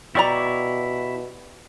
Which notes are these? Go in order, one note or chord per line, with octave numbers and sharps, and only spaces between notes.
B2 E4 G4 D5 A#5 C#6 D6